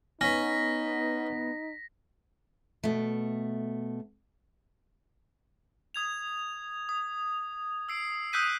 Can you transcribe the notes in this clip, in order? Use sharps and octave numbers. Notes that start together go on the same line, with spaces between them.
B3 C#4 D#4 A#6 B6
B2 A3
D#6 G#6 F7
D#6
E6 C7 D7
D#6 E6 F#6 G6 B6 D#7